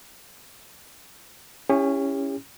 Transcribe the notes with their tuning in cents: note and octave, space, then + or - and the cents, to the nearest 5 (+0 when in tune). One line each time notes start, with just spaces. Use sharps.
C#4 +0 E4 +0 G4 +40